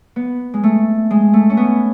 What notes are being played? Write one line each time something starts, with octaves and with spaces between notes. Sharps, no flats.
B3
G#3
A3
G#3
A3
C#4
B3